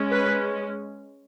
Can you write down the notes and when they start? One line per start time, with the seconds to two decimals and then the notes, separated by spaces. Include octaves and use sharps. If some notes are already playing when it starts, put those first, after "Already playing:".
Already playing: G#3 C#4
0.11 B4